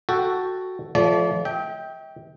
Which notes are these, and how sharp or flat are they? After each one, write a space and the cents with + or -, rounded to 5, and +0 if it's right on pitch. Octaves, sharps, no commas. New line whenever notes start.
F#4 +0 A4 +0 G5 +0
F3 +0 A3 -30 D5 -35
E5 -45 G5 +0